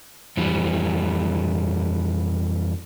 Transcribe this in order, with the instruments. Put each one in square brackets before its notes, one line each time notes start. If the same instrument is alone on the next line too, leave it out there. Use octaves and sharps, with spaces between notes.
[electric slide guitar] F2 E3 G3